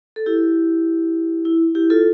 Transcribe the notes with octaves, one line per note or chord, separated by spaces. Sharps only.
A4
E4 G4
E4
E4 G4
F4 A4